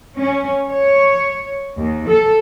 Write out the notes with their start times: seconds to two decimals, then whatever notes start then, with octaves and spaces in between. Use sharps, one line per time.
0.17 C#4
0.68 C#5
1.77 D#2
2.08 A4